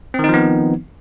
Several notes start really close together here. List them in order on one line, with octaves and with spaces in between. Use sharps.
C4 D#3 D#4 F3 B3